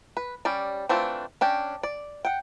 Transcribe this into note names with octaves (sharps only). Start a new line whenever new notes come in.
B4
G3 C#4 D5
E3 A3 C4 D4 F4
C#4 D4 G5
D5
F#5 G5